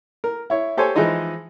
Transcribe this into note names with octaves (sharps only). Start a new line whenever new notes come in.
A#4
E4 C#5
G4 A4 C5 C#5 G#5
E3 F3 G#3 D#4 D#5